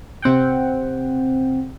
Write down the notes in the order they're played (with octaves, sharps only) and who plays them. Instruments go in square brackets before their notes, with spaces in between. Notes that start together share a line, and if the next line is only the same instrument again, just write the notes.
[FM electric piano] C3 C4 F#5 G5